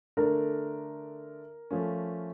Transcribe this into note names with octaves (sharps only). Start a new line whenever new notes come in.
D3 A3 D4 A4 A#4
F3 A3 C#4